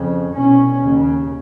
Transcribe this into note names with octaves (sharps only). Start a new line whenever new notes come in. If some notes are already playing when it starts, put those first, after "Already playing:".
Already playing: F2 C#3
C2 B2 C#4
D#2
C#3